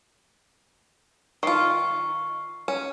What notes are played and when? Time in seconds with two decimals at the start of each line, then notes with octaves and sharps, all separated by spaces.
1.43 D#3 F4 C#6 C7
2.68 C#4